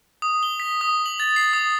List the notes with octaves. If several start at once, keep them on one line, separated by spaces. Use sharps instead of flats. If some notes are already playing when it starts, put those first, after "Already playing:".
D#6
G7
B6
D#6
F#7
A6
C7
D#6